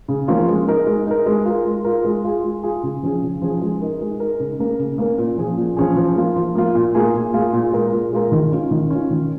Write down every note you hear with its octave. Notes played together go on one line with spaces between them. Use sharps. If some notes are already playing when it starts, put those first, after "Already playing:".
C#3
F3 A#3 C#4 F4
G#3
D#4 A#4
G#3
D#4 A#4
G#3
F4 A#4
G#3
F4 A#4
G#3
F4 G#4
G#3
F4 G#4
C#3
F3 C#4 G#4
C#3
F3 C#4 G#4
G#3
D#4 A#4
G#3
D#4 A#4
C#3
A#3 C#4 A#4
C#3
A#3 C#4 A#4
A#2
F3 C#4 G#4
A#2
F3 C#4 G#4
F3
A#3 F4
F3
A#3 F4
A#2
A#3 F4 G#4
A#2
A#3 F4 G#4
A#2
G#3 F4 A#4
A#2
G#3 F4 A#4
D#3
C#4 F4
D#3
C#4 F4
D#3